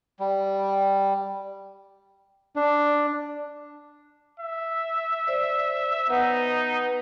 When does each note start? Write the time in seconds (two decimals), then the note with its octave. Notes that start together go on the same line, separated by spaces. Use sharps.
0.20 G3
2.56 D4
4.40 E5
5.27 C5 D5
6.10 B3 D#4 B4 F#5